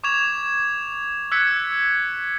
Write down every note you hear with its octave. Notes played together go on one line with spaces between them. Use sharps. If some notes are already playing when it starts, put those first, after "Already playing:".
C#6 D6 G#6 E7 F7
E6 F#6 G#6 B6 C#7